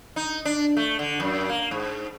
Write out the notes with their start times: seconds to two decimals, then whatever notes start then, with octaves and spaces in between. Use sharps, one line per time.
0.16 D#4
0.45 D4
0.77 A3
0.99 D3
1.20 F#2
1.49 A#3
1.71 G#2